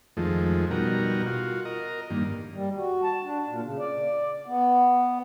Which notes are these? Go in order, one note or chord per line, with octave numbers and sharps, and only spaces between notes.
F2 D#3 F3 G#3 A3
B2 G3 D#4 F#4 A#4
F4 F#4
A#4 D#5
G2 D#3 A#3
G3
F#4
A5
D4
A#2
C#3
D5
B3